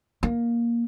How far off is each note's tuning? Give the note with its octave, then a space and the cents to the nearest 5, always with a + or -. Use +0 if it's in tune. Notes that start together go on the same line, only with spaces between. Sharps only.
A#3 +10